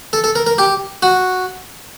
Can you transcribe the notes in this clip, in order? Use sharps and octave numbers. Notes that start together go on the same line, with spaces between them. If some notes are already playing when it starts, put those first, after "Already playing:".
A4
A4
A#4
A#4
G4
F#4